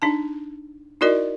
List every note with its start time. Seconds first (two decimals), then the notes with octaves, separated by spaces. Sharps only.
0.02 D4 D#4 A5
1.01 D#4 E4 F#4 A#4 D5 D#5